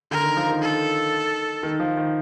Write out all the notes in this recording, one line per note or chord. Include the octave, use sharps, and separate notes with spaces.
D3 A#4
D#3
F3
D#3
A4
D#3
F3
D#3